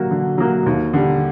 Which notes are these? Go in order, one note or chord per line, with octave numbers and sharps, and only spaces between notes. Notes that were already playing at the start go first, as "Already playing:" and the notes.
Already playing: D3 F#3 A#3 F#4
D3
F#3 A#3 F#4
D#2
D3 G3